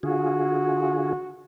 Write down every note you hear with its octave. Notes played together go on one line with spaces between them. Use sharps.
D3 F4 F#4 G#4